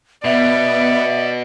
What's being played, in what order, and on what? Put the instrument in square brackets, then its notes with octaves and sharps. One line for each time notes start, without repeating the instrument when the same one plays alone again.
[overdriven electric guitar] B2 [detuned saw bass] B3 [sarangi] D5 [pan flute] E5